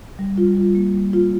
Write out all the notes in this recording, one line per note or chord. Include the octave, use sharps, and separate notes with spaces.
G3
F4
G3
A#3
G3
F4